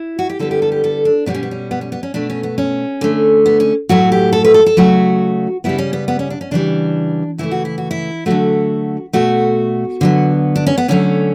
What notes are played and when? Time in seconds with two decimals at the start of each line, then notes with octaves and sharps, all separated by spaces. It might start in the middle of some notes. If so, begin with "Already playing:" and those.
Already playing: E4
0.19 F#4
0.29 G4
0.39 D3 G3 B3 A4
0.51 G4
0.62 A4
0.72 G4
0.84 A4
1.05 D4
1.26 B2 G3 B3 D4
1.34 C#4
1.43 B3
1.51 C#4
1.71 B3
1.81 C#4
1.92 B3
2.03 C#4
2.14 B2 A3 D4
2.30 C#4
2.43 B3
2.58 C#4
3.01 D3 A3
3.46 B3
3.60 C#4
3.89 A2 F#3 A3 F#4
4.12 G4
4.33 A4
4.45 B4
4.54 A4
4.66 A4
4.77 C#3 F#3 A3 F#4
5.64 C#3 G3 B3 E4
5.78 C#4
5.93 B3
6.08 B3
6.19 C#4
6.30 D4
6.41 C#4
6.51 C#3 E3 G3 D4
7.38 C#3 E3 A3 E4
7.51 F#4
7.65 E4
7.78 F#4
7.91 E4
8.26 D3 F#3 A3 F#4
9.13 B2 A3 F#4
10.01 D3 F#3 B3
10.56 D4
10.67 C#4
10.78 B3
10.88 D3 F#3 A3 C#4